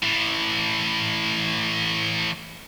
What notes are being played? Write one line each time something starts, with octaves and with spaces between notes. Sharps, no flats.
A2 E3